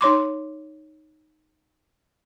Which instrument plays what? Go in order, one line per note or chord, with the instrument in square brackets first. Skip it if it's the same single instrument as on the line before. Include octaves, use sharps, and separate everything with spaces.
[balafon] D#4 C#5 C6 D6